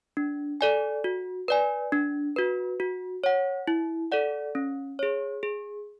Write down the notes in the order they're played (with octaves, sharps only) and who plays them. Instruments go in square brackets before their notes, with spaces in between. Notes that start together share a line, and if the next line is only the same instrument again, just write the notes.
[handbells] D4
A4 D5 G#5
F#4
B4 D5 G#5
D4
F#4 B4
F#4
C#5 F#5
E4
A4 D5 F#5
C#4
G#4 C#5
G#4